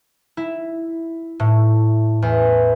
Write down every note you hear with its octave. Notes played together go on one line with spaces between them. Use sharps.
E4
A2
E2